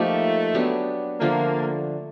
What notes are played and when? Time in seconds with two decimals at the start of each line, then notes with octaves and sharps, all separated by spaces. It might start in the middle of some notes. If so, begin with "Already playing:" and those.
Already playing: F3 A3 A#3 D#4 G4
0.55 F#3 B3 D4 G4
1.21 D3 F3 A3 A#3 D4